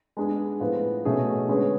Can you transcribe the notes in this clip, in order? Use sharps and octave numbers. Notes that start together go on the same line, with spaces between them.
G#3 B3 D4 G#4 B4
A2 F3 B3 F4
B2 A3 C#4 G#4 B4
D3 G#3 C#4 G#4 B4